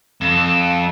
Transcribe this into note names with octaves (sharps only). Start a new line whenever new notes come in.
F2 E7